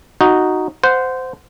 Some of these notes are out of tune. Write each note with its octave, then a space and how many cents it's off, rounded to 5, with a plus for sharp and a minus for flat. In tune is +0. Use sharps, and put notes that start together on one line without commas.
D#4 +0 F#4 +0
C5 -15 F#5 -15